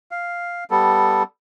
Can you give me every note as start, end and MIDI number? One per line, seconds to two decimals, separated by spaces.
0.11 0.64 77
0.71 1.23 55
0.71 1.23 59
0.71 1.23 69